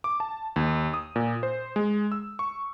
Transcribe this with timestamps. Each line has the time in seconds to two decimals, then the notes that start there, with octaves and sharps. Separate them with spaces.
0.04 D6
0.20 A5
0.56 D#2
0.94 D#6
1.16 A#2
1.43 C5
1.76 G#3
2.12 E6
2.39 C#6